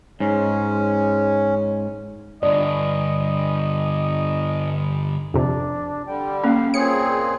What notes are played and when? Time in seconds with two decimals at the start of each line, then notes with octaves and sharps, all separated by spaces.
0.20 G#2 G#3 C#4 C#5
2.43 G2 D3 D5 D#5
5.34 F2 C3 D4
6.06 D3 G3 G5
6.44 A#3 C#4 F5
6.74 A#2 C4 G#4 C#5 C#7